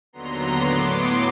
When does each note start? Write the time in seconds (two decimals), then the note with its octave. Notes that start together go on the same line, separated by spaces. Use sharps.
0.13 D#2 D3 F#3 B3 A#5 C6
0.61 A2 F#3 B3 C6 D6